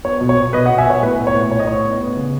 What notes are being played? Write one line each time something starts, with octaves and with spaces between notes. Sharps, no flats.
B3 C#5
B2
C#5
B2
B2 B4 D#5
D#5 F#5
B2
E5 G#5
B2 C#5
A2 B4
B3
C#5
A2
A2 C#5
D#5
A2 C#5
B3
B3
C#3